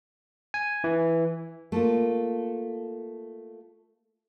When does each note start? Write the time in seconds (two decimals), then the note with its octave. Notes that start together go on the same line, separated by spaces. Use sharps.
0.54 G#5
0.84 E3
1.72 A3 A#3 F4